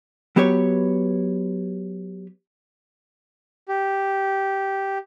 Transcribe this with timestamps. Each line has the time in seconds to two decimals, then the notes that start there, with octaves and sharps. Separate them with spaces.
0.36 F#3 B3 G4 B4 C#5
3.68 G4